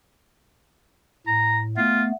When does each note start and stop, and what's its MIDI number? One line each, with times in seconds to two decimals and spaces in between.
1.27 1.77 45
1.27 1.59 82
1.77 2.12 57
1.77 2.12 59
1.77 2.02 65